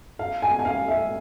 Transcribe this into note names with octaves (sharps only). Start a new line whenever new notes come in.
F5
G#5
G#5
F5
E5